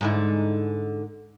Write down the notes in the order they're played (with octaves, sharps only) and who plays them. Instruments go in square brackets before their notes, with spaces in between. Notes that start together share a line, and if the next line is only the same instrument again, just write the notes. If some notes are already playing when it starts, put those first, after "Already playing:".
[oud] G#2 D3 E4